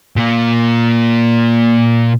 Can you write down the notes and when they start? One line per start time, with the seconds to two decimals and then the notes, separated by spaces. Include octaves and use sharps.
0.16 A#2 A#3